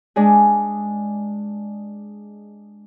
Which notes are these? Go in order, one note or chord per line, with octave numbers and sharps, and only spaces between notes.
G#3 D4 G#4